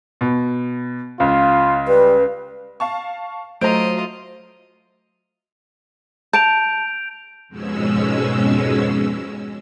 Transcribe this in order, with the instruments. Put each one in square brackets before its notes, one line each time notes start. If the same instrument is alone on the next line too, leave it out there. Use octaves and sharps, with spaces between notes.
[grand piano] B2
[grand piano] C#2 [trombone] F4
[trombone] G3 [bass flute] B4
[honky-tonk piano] F5 A5 C#6
[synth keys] F#3 A3 [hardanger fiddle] F4 D#5 [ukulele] C5 A#5 [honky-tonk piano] D7
[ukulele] A5 [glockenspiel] G6 D7 F7
[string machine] F2 G#2 B2 G#3 C#4 E6